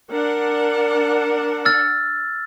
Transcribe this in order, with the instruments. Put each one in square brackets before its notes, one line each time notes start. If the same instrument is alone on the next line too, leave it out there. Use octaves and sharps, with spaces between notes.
[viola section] D4 F#5 [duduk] A#4
[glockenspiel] E6 F6 A6